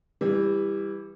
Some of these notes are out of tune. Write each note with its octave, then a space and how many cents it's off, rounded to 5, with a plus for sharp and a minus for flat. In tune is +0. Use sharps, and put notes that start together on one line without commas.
E3 +0 G3 +20